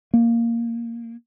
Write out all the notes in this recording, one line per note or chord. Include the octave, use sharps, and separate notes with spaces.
A#3